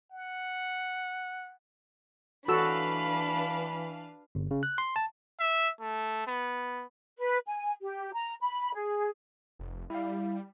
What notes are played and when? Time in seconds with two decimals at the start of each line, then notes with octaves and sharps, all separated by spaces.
0.11 F#5
2.48 E3 D4 F#4 A4 B4 F5 B5 E6
4.35 G1
4.51 C#3
4.63 F#6
4.78 C6
4.96 A5
5.39 E5
5.81 A3
6.27 B3
7.18 B4
7.47 G#5
7.82 G4
8.14 A#5
8.40 B5
8.75 G#4
9.59 F1
9.90 G3 E4 F5